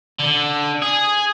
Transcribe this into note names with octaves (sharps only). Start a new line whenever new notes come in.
D3
G#4